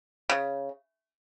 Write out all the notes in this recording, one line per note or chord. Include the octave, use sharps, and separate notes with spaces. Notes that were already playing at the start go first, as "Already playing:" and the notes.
C#3